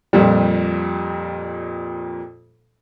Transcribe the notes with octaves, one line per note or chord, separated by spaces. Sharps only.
F2 A#2 G3